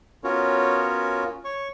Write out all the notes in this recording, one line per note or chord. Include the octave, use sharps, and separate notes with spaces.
B3 C#4 F4 F#4 A#4 C#5
C#5 C#6